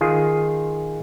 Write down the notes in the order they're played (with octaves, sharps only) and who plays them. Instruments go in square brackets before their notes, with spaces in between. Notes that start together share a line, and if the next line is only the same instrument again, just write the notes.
[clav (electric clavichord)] D#3 F4 G#4